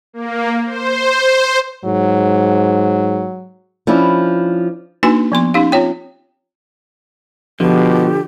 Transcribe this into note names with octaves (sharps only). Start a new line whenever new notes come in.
A#3
C5
G#2 F#3
F3 C#4 D4 E4
A#3 D4 D#4 F#4 B4 G#5
F3 B3 C6
C#4 D#4 G4 F5
C4 F4 C#5 G5
B2 D3 F3 G4